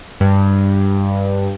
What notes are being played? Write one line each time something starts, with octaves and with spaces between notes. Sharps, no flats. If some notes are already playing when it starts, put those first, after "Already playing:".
G2